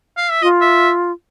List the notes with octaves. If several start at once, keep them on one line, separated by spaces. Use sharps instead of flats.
F5
E5
F4 D#5
E5